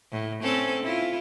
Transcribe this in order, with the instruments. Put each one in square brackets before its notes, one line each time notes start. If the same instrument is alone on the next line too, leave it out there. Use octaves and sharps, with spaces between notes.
[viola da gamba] A2
C4 C#4 A4
E4 F4